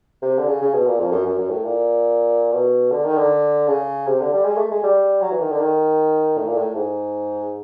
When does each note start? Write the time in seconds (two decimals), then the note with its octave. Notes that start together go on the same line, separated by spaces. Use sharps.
0.22 C3
0.38 D3
0.48 C#3
0.62 C#3
0.74 B2
0.87 A#2
1.00 F2
1.12 F#2
1.26 F#2
1.38 F#2
1.50 A2
1.64 A#2
2.52 B2
2.91 D3
3.05 D#3
3.18 D3
3.68 C#3
4.07 C3
4.20 D3
4.33 G3
4.45 G#3
4.57 A3
4.71 G#3
4.83 G3
5.22 F#3
5.31 E3
5.41 D#3
5.51 D3
5.60 D#3
6.38 A2
6.47 A#2
6.57 A2
6.75 G#2